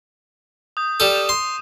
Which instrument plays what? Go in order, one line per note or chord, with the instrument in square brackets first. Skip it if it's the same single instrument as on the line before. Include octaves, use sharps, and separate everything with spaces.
[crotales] D#6 G6
[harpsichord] G3 A4 [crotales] D#7 E7
[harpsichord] C6